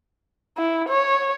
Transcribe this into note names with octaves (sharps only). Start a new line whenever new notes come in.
E4
C#5